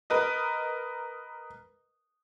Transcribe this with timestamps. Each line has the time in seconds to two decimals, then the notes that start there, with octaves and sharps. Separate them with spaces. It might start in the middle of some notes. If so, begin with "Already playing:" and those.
0.10 A#4 B4 D#5